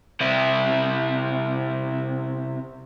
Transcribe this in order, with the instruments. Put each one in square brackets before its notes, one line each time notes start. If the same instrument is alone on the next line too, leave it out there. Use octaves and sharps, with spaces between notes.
[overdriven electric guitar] C3 E4